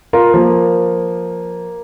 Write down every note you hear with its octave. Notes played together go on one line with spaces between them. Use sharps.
F4 A#4
F3 A#3